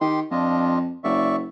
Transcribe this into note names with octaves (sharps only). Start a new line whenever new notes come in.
D#3 G4 C6
F2 D4 F4 D#5
F#1 D5 E5 C#6